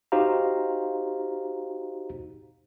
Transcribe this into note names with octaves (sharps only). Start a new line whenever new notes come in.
D#4 F#4 G4 C5 F5 A#5